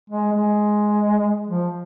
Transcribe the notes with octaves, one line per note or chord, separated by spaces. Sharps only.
G#3
G#3
F3